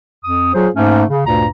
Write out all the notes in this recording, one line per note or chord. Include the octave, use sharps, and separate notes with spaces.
F2 D#6
F#3 F4 G#4 C5
G#2 A3 A#3 C#4
C#3
D2 G2 A#2 A#5